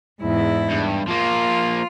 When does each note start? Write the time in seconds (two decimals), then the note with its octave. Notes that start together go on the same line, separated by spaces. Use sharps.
0.21 E2 G#2 E4
0.70 G2
1.08 F3 A#3 F4